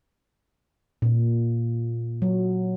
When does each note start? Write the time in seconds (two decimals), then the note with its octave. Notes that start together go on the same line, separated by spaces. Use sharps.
1.02 A#2
2.22 F#3